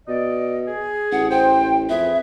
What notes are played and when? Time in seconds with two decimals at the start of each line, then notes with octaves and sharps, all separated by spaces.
0.08 B2 D5 D#5
0.67 G#4
1.12 A1 F#5
1.31 C5 G5
1.89 F2 G#4 B4 E5